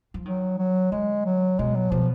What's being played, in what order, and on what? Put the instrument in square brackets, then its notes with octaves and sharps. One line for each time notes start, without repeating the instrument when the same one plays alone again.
[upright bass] F3
[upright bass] D#3 [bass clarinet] F#3
[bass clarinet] F#3
[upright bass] D3 [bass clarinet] G#3
[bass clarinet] F#3
[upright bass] B2 [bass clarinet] G#3
[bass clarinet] F#3
[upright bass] B2 [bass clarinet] F3